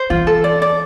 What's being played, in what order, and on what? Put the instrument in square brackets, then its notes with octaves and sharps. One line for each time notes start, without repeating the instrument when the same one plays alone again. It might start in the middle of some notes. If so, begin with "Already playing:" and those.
Already playing: [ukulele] C5
[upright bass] E3 [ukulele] F4
[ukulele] A4
D5
D5